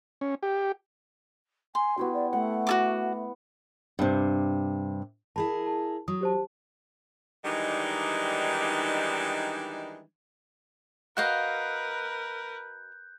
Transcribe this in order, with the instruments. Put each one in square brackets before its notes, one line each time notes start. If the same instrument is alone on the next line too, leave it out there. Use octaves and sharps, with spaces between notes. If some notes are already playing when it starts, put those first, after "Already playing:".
[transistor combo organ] C#4
G4
[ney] G#5 [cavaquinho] C6
[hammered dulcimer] B3 E4 G4 [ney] F#4
[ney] D5
[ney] A3 [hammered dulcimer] F#5
[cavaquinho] F#4 A4 D6
[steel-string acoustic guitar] G2 C3
[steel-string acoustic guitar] E4 G#4 A#4 [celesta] A5 B5
[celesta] A5
[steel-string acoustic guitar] F#3 [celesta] D#6
[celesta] G4 C5 A5
[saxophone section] D#3 E3 G3 G#3 D4 D#4
[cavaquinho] F#4 D#5 F5 [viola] A#4 B4 [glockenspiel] F#6 G6